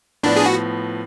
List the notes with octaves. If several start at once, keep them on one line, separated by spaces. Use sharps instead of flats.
A2 F3 B3 D4
G#4
F#4